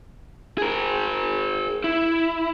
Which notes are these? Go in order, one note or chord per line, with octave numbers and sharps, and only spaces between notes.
G#4 A#4
E4